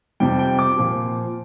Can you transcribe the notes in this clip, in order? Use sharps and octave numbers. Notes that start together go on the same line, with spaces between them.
F2 C3 G3 G5
G5
D6
A#2 F3